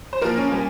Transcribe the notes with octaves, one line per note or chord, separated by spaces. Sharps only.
C5
A#2 F3 A#3 A#4
C#4
A#2 G3 A#3